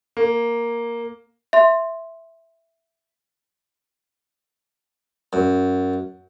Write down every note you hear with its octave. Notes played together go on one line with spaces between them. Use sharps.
A#3
E5 C6
F#2